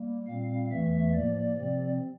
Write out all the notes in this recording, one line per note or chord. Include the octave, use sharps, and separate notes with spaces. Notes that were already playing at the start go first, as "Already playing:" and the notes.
Already playing: G3 A#3
A#2 G3 C4 F5
E2 E3 A3 E5
A2 F3 A#3 D5
C3 F3 C4